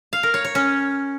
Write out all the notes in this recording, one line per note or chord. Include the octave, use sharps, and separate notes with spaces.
F5
A#4
C#5
C#5
C#4